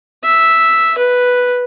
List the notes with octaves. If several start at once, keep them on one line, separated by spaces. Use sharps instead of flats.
E5
B4